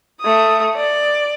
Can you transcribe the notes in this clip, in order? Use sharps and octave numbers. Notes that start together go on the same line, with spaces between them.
A3 D#6
D5